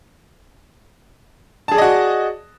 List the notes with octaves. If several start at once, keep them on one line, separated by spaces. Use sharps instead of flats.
F#4 G#4 D5 D#5 A5